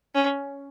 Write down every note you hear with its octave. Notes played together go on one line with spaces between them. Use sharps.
C#4